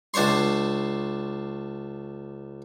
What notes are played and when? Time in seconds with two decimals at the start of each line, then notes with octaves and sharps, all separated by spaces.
0.14 C#2 D4 C5 C#5 C6